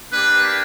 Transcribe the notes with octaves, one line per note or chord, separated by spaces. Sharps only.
A#3 D4 G4 B4